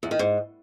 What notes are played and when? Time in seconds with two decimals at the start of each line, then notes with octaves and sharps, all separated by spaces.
0.03 E2
0.11 D#3
0.19 G#2